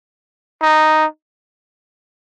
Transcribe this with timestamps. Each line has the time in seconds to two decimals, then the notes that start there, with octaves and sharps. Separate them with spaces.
0.62 D#4